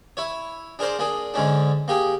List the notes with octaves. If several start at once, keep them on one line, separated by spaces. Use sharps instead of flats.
E4 C#5
D4 G#4 A#4 C5 D5
A#3 D4 G#4
G#2 D3 G#3 C#4 D4
A#3 G4 G#4